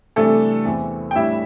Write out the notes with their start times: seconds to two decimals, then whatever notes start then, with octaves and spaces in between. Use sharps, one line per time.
0.16 C3 E3 G3 A3 D4 A4
0.65 E2 E3 C4
1.11 G5
1.15 A2 G3 D4 E4 E5